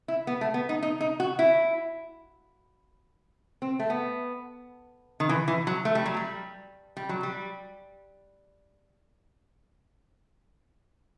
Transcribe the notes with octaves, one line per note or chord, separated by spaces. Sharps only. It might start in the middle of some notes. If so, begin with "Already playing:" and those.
E4
B3
A3
B3
D#4
D#4
D#4
F#4
E4
C4
A3
B3
D#3
E3
E3
F#3
A3
G3
F#3
G3
G3
F#3
G3